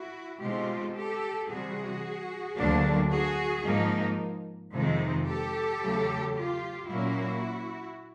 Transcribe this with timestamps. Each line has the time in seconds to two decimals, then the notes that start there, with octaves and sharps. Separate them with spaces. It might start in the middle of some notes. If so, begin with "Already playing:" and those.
Already playing: E4 F#4
0.41 B2 G#3 C4 D#4 F4 G4
0.95 G4 A4
1.49 C3 E3 G3 F#4 G#4
2.57 D2 D3 F#3 A#3 D4
3.11 F#4 G#4
3.65 G#2 F3 A#3 D#4
4.72 F2 C3 D#3 G#3 C4 D#4
5.26 G4 A4
5.81 E2 C#3 F#3 A3
6.34 F4 G4
6.88 A#2 F#3 A#3 C#4 E4 F#4